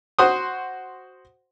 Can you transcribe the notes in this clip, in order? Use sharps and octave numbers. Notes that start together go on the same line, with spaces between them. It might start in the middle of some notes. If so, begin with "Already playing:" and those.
F#4 C5 C6 D#6